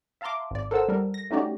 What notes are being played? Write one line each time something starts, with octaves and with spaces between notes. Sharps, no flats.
E5 F5 A5 A#5 C6 D6
G#1 D5
A4 A#4 C5 F#5 A5 E6
G3 A#4
A#6
A3 C#4 D#4 F#4 G4 D5